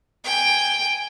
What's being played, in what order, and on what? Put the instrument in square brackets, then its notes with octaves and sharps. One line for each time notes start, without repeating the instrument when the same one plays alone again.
[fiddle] G5 G#5